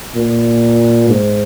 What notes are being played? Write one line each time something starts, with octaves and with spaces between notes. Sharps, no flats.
A#2
G#2